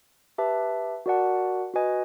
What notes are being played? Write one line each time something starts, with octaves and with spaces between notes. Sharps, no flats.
G4 B4 E5 A5
F#4 A#4 D5 F#5 A5
F#4 B4 D#5 G#5